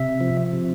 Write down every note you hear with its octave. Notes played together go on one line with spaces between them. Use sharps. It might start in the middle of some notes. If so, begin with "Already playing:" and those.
Already playing: C3 E5
F3
C3